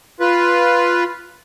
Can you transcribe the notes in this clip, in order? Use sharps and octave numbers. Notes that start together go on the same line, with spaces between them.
F4 B4